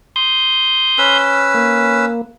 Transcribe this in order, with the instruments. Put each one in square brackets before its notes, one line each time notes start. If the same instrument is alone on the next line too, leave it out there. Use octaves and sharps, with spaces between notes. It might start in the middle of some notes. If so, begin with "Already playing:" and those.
[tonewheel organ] C6 D#6 G6
[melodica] C#4 B4 E6
[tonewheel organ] A#3